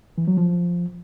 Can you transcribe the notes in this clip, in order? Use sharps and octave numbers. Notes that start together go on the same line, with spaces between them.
E3
F#3
F3